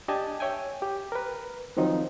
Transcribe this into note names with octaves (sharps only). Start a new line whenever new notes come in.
D4 G4 D#5 G#5 A5
C#5 E5 G5 G#5
G4
A#4 B4
D#3 F3 F#3 C4 D#4